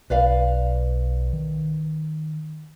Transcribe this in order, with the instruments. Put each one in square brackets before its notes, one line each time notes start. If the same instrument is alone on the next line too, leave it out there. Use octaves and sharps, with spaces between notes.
[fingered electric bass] B1 [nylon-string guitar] B4 D5 F5
[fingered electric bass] D#3